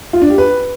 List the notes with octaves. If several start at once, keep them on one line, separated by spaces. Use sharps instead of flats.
F4
D4
G4
B4